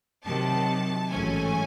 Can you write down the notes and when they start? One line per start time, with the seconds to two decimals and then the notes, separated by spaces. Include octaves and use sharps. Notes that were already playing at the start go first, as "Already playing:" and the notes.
0.25 C3 D#3 F#3 A5
1.10 A1 G#2 F#3 A3 C#4 G#5